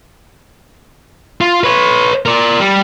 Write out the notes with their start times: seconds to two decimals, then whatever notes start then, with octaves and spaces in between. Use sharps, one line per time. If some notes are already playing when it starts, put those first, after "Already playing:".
1.41 F4
1.64 B4 C#5
2.26 A#4 D5
2.60 G3